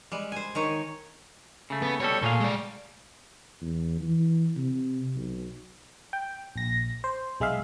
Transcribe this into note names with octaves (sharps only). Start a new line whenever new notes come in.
G3 G#3
C5 G#5
D#3 D#4 C#5
C#3 A3
B3
B2 G3 A4 C#5
A#2 A3 G#4 F5
G#3 D5
E2
E3
C3
B1
G5
A#1 A#6
C5
B1 G#3 G#4 E5 F5